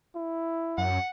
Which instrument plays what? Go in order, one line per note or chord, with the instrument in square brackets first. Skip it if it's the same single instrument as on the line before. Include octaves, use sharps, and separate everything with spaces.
[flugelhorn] E4
[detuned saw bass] F#2 [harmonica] F#5